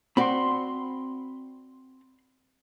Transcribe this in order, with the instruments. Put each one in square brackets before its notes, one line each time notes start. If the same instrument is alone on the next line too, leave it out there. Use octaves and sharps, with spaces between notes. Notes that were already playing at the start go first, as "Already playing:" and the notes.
[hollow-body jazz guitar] C4 F#4 D5 [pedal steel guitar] B5 C6